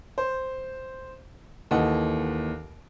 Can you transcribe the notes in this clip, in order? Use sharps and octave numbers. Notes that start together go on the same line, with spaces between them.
C5
D#2 E3 A4 D#5 F#5